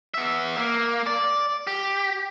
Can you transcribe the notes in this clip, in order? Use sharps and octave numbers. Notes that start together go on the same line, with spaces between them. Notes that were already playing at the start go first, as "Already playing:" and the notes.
B3 E5
A#3
D5
G4